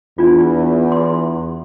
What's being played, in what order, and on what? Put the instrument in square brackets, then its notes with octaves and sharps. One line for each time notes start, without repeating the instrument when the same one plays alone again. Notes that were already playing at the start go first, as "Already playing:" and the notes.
[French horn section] E2 [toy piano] D4 F4
[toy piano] C6